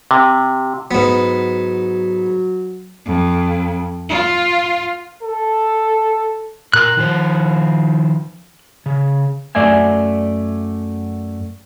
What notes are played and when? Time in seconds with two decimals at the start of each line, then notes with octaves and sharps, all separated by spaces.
0.11 C3
0.91 G#2 F#3 B3
3.06 F2
4.09 F4
5.23 A4
6.73 A#2 A#4 F#6
6.97 D#3 F3 C5
8.86 C#3
9.55 F#2 A3 D5 E5 G#5